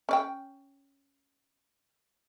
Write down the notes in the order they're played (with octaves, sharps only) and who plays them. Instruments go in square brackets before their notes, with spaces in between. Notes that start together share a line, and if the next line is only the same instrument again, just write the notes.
[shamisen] C#4 D5 G5